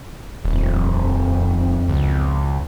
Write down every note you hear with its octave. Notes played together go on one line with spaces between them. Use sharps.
D#1 F2
C#2